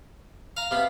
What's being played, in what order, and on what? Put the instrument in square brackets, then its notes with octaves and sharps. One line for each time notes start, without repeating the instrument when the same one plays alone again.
[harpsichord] F5 A#5
[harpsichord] C3 B3 [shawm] F5